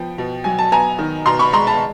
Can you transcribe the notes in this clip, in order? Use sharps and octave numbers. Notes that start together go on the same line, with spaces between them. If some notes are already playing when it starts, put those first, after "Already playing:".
Already playing: F3 B3 G5
B2
F#3 G#5
A5
B3 G#5 A#5
D#3
B2 A#5 C6
B5 C#6
G#3 A#5 C6
A5 B5